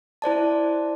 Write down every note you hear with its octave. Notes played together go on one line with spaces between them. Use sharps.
E4 C5 D5 A5